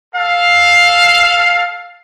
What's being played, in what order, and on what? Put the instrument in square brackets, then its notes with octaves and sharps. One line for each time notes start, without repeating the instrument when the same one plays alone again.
[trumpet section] A4 F5